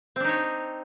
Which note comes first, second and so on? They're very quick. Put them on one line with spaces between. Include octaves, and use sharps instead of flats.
C4 D4 D#4 C#5